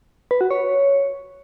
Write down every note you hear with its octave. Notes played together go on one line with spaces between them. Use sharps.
B4
F#4
C#5